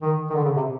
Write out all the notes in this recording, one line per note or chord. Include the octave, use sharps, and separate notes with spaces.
D#3
D#3
D3
C#3
C3